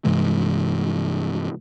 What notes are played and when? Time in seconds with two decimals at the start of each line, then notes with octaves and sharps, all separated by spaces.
0.05 G2 C3 E3 G#3